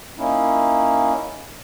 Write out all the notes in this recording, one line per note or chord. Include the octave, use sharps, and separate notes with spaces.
A#3 C#4 D#4 E4